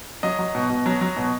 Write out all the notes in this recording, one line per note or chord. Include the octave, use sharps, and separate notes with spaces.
F#3 D#5
F#3
B2
B2
F#3
F#3
B2